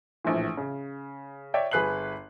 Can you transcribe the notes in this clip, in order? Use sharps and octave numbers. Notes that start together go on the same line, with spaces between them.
A#1 A2 E3
C#3
C#5 D5 E5 G5
G1 G#4 B4 F#6 C7 F#7